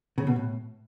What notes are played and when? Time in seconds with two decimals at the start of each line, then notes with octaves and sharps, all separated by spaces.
0.18 C#3
0.27 B2
0.36 A2